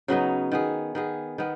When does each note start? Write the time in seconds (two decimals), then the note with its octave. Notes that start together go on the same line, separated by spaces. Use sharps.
0.08 C#3 F#3 B3 D#4
0.52 D#3 B3 G#4
0.95 D#3 B3 G#4
1.38 D#3 B3